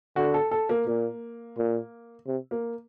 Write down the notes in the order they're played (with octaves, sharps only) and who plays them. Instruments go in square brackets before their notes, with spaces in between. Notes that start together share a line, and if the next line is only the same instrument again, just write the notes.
[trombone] D3 [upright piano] F#4
[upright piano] A4
A4
A#3
[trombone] A#2 [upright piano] A#3
[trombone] A#2
C3
[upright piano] A#3